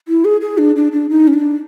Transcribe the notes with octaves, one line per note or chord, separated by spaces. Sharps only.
E4
G#4
G#4
D4
D4
D4
D#4
C#4
D4